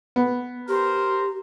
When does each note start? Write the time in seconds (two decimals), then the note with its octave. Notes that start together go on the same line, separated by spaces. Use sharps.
0.16 B3
0.68 G4 A#4 C5